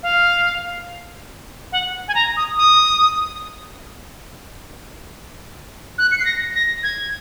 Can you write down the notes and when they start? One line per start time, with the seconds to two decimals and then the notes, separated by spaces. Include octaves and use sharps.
0.03 F5
1.72 F#5
2.08 G#5
2.15 A#5
2.37 D#6
2.57 D#6
5.98 F#6
6.11 C#7
6.18 C7
6.25 A#6
6.55 A#6
6.83 G#6